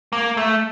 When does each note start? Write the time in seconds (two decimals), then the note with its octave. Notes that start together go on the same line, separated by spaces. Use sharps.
0.13 A#3
0.37 A3